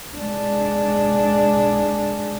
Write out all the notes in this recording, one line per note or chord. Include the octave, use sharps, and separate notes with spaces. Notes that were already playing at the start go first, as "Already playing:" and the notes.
G#3 D4